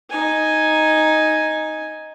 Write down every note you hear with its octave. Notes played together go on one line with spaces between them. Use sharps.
D#4 G#5